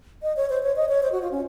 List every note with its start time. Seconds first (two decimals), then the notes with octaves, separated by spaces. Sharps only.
0.23 D#5
0.36 C#5
0.50 C5
0.63 C#5
0.76 D#5
0.89 C#5
1.03 C5
1.12 F#4
1.22 F4
1.32 C#4